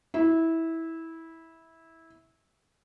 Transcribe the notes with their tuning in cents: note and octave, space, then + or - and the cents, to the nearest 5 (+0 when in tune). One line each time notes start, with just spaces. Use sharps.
E4 -15